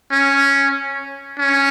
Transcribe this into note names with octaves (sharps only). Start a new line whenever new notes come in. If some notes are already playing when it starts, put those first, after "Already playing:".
C#4
C#4